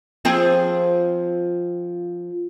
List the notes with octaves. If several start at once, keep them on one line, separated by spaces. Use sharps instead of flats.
F3 C4 G#4